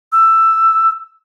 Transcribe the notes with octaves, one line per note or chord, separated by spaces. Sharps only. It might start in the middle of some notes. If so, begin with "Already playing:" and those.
E6